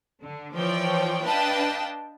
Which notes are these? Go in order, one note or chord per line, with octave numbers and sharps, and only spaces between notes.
D3
E3 F3 C#5 D5 G5
D4 B4 D#5 F5 G5 A5